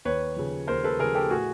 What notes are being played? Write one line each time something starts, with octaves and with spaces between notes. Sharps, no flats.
D#2 B4 C#5
C#3 F3
D#2 A#4 C5
A4 B4
C#3 F3 G#4 A#4
G4 A4
A2 F#4 G#4